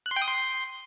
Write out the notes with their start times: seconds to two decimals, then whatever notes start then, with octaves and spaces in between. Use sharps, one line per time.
0.06 F#6
0.11 C6
0.16 G5
0.22 D#6
0.27 C6